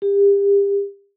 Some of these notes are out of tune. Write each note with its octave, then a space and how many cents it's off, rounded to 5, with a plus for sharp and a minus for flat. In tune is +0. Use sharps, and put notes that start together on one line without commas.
G4 +35